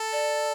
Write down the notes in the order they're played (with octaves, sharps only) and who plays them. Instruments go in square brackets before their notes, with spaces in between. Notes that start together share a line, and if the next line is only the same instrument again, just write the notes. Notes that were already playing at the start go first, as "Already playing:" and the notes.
Already playing: [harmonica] A4
[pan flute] D5